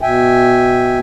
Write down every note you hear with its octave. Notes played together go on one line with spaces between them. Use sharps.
B2 E5 G5 G#5